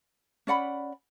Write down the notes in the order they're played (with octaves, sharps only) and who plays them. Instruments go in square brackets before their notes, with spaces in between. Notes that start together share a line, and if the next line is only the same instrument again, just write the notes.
[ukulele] C#4 D5 F#5 B5